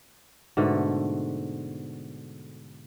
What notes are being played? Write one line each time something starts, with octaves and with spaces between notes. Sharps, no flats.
G#2 B2 D3 A3